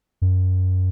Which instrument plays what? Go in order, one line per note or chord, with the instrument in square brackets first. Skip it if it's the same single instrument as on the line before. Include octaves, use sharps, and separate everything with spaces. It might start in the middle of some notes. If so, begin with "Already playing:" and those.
[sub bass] F#2